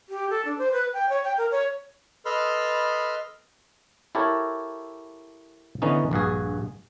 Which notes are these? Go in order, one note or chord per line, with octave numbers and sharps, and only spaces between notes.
G4
A4
D4
C5
B4
G5
C#5
G5
A#4
C#5
A4 B4 D#5 B5 C6 F6
E4 G4 A4 A#4 C#5
D3 E3 B3 C#4 D#4
A#1 G2 F#4 G#4